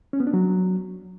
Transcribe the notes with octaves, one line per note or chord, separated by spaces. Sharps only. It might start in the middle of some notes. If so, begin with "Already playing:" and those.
C#4
B3
D4
F#3